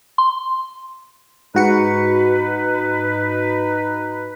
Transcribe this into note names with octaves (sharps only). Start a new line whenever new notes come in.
C6
G#2 D#4 F#4 B4 C#7